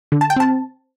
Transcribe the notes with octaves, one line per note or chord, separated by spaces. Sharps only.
D3
A5
G5
C4 A5